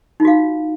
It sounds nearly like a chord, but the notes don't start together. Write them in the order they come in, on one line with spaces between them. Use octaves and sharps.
D#4 F4 F#4 F5